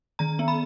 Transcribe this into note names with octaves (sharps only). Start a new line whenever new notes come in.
D#3 A#5
B3
B5